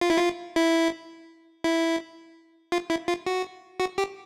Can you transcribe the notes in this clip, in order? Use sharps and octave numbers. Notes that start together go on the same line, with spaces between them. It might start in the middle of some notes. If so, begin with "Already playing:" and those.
F4
E4
F4
E4
E4
F4
E4
F4
F#4
F#4
G4